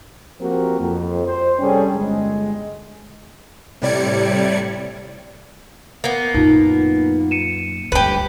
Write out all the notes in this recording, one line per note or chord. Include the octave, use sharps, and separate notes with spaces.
F3 A#3 C4 F#4 G4 A#4
F2
C5
C2 G3 C#4 G#4 A4 G5
G1 G#3
A2 C3 G3 D5 G#6 C#7
A#3 B3
F#2 A#2 D#4 F4
C#7 D#7 E7
D2 G2 G4 B4